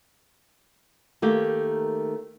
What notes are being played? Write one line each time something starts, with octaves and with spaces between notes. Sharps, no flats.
D#3 A3 A#3 G4